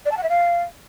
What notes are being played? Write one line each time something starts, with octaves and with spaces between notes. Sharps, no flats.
D5
A5
F#5
E5
F5